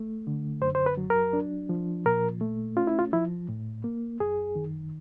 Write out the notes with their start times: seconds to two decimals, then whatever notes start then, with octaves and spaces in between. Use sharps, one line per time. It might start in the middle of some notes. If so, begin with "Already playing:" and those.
Already playing: A3
0.27 D3
0.62 F#2 C5
0.75 C5
0.86 B4
0.97 F#3
1.10 A#4
1.33 D4
1.69 F3
2.05 A#2 A#4
2.41 A3
2.77 C#4 F4
2.87 E4
2.99 F4
3.13 F3 E4
3.49 A2
3.84 A#3
4.20 F#2 G#4
4.56 D#3